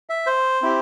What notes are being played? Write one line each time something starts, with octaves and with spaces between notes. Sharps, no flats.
E5
C5
C4 E4 G4